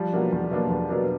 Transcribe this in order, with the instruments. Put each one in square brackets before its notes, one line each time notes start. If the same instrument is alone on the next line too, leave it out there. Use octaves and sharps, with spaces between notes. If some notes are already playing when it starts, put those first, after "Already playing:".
Already playing: [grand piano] F3 G3
[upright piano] B2 F#3 A#3 D4
E2
B2 F#3 A#3 D4
E2
B2 F#3 A#3 D4